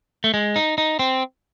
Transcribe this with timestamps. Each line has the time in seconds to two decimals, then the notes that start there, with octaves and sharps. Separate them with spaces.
0.24 A3
0.34 G#3
0.56 D#4
0.78 D#4
0.99 C4